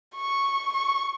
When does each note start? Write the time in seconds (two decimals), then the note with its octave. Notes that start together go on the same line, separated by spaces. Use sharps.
0.16 C#6
0.73 C#6